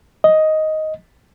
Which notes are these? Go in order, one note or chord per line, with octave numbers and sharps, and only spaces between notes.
D#5